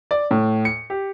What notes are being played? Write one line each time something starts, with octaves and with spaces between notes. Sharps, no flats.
D5
A2
C#7
G4